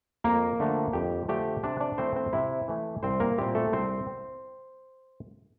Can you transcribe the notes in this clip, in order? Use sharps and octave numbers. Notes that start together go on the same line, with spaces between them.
F2 A#3 A#4
D3 F3 A3 D4
F2 G4
D3 F3 A3 D4 G4
C3 D4 D5
D4 D5
E3 A3 C4 E4 C5
C4 C5
C3 E4 E5
E3 A3 E4
C2 C4 C5
A#3 A#4
A#2 G3 C4 E4 G4
A3 A4
C2 C4 C5